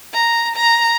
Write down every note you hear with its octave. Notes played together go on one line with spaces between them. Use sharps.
A#5
A#5